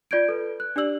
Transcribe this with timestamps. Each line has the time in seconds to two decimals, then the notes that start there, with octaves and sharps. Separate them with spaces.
0.11 F4 D5 G6 G#6 D7
0.29 A4 B4
0.60 F#6
0.76 D4 G4 D5 E6 F#7